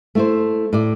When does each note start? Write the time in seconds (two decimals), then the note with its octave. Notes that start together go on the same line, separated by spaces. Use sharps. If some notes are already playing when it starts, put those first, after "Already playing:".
0.15 A3 E4 C5
0.73 A2 D5